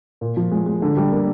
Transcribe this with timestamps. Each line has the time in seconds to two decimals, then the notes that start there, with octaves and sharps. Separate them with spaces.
0.21 A#2
0.37 F3
0.52 G#3
0.66 G#3
0.82 D3
0.97 G3
1.12 A#3